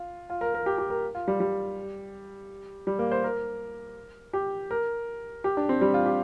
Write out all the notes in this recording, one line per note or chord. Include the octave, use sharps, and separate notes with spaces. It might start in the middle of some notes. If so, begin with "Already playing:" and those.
Already playing: F4
F4
A#4
A#4
G4
G4
A#4
F4
G3
G3
G3
A#3
C5
A#4
G4
A#4
G4
D4
C4
G3
F4
G4